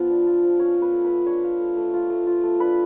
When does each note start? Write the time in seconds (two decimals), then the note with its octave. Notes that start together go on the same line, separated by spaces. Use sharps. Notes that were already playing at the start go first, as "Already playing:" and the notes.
Already playing: F3 B3 F4
0.10 D4
0.26 F4
0.43 F3
0.60 C#4 C#5
0.77 F4
0.82 B4
0.93 A3
1.05 B4
1.10 A3
1.27 D4 C#5
1.44 F4
1.60 A3
1.77 A3
1.94 F4
2.10 A3
2.27 F4
2.44 A3
2.60 D4 B4